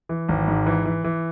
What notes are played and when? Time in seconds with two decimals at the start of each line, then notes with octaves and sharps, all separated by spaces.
0.09 E3
0.29 G#1
0.48 G#2
0.66 E3
0.85 E3
1.04 E3